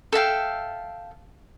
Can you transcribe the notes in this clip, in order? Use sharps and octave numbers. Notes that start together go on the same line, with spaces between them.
A4 E5 F5 G5